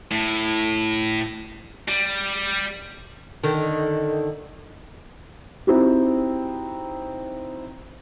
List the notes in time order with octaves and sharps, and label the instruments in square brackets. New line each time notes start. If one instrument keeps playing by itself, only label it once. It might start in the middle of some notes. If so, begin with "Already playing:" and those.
[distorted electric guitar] A2
G3
[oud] D3 D#3
[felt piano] C4 D#4 E4 F#4 G4